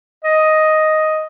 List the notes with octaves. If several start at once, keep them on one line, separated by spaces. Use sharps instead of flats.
D#5